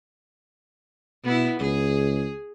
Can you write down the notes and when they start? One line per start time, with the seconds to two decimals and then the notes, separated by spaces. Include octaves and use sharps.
1.25 B2 B3 E4
1.60 C#2 G#4